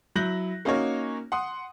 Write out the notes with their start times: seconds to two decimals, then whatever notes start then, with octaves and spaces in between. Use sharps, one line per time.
0.15 F#3 E4 F#6 G6 A#6 F#7
0.65 A#3 C#4 D#4 F#4 A#4 C#5
1.32 F#5 C6 D#6